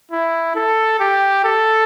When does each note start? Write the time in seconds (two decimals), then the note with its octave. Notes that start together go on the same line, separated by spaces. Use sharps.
0.11 E4
0.55 A4
1.00 G4
1.44 A4